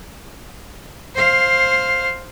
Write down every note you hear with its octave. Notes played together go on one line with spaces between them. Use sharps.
C5 F5